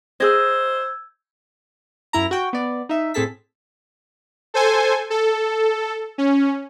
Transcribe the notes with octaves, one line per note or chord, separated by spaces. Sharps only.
G#4 C5 D#5 E6 G6 G#6
F#2 E4 A#5
F#4 G5
B3 D5
D#4 E5
A2 C4 G#4 A4 A5 B6
A4 C5 G#5
A4
C#4